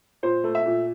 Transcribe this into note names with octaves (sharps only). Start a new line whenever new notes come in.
A#2 C5
A3
E5
A#2